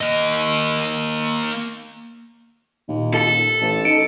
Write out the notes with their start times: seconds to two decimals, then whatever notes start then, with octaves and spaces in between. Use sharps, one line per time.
0.01 A#3 D#5
2.88 D#2 A#2
3.14 A4
3.61 A1 A5
3.85 D#4 C#7 D7